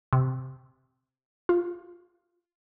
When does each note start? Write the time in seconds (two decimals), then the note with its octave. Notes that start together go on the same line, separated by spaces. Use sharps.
0.13 C3
1.49 F4